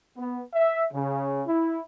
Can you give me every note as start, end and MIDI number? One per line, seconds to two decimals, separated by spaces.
0.16 0.41 59
0.54 0.85 76
0.93 1.42 49
1.47 1.81 64